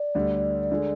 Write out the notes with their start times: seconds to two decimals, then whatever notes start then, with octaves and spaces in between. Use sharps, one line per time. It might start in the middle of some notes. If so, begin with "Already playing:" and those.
Already playing: D5
0.15 D2 D3 G3
0.72 D3 G#3